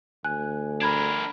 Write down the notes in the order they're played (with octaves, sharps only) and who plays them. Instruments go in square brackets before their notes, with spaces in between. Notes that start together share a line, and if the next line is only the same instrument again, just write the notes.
[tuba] D2 [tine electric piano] G#5 [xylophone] F#6
[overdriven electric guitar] D4 A#4 [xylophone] B5 G#6